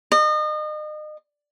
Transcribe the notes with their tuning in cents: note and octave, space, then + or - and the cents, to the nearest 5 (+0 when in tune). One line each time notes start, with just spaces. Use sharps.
D#5 -35